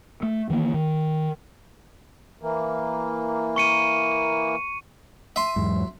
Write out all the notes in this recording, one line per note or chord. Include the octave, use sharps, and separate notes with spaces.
A3
D#3 E3 A#3
D#3
E3 A#3
C#6 C#7 D#7
E5 C6 D#7
E2 G#2 F#3